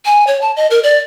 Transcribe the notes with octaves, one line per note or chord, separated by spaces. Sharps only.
G#5
C#5
A5
D#5
A#4
D5